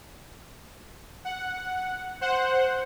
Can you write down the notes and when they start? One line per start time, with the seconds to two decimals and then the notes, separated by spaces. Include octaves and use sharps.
1.25 F#5
2.21 C5 F#5